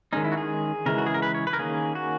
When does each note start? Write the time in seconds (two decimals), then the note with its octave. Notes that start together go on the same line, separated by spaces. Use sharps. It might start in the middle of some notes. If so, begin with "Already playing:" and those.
0.13 D#3 G#3 C#4 D#4
0.24 E4
0.32 F#4
0.37 G#4
0.86 C#3 E3 G#3 A#4
0.98 F#4
1.06 G#4
1.14 A#4
1.22 B4
1.35 C#5
1.47 B4
1.53 A#4
1.59 D#3 A#3 C#4 G#4
1.95 F#4